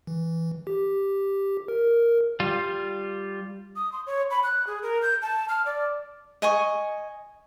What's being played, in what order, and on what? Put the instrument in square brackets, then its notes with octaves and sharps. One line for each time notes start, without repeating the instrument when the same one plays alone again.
[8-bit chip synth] E3
G4
A#4
[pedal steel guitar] G3 F4
[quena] D#6
C6
C#5
B5
F#6
G#4
A#4
G6
A5
F6
D5
[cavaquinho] D#5 G#5 C#6